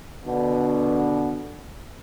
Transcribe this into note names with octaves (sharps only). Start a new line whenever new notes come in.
B2 D3